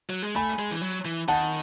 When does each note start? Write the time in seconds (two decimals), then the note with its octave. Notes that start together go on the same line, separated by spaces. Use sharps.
0.09 F#3
0.22 G#3
0.36 A3 G#5 B5
0.59 G#3
0.71 E3
0.82 F#3
1.05 E3
1.28 D#3 F#5 A5